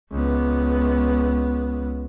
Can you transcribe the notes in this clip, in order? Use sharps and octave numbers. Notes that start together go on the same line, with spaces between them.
C#2 B3